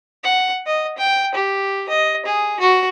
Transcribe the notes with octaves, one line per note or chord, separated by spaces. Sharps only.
F#5
D#5
G5
G4
D#5
G#4
F#4